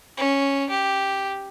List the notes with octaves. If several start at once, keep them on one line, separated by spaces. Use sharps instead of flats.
C#4
G4